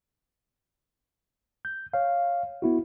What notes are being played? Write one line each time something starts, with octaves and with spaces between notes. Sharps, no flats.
G6
C#5 F5
B3 E4 F#4